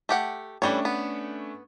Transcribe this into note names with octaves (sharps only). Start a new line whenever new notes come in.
A3 G4 F#5
E3 G3 A3 C#4 D4 C#5
B3